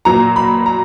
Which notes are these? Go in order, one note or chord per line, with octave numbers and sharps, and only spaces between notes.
A#2 F#3 A#5
B5
A#5